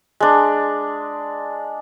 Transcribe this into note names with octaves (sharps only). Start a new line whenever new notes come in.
G#3 D4